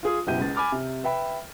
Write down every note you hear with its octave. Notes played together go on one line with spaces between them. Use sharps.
F4 G#4 D#6
F#1 B2 E4 G4 G6 D#7
C#2 G#3 A6
G#5 B5 D6 F6 A6
C3
B4 E5 G5 B5